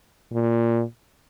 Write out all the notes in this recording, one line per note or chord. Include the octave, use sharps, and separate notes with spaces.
A#2